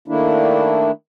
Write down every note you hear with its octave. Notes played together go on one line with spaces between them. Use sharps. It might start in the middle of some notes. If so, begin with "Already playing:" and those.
D#3 A3 A#3 D4 E4